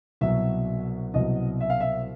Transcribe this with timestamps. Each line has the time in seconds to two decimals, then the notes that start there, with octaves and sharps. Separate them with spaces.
0.21 C2 B2 F#3 E5
1.14 C2 B2 F#3 D#5
1.61 E5
1.70 F5
1.80 E5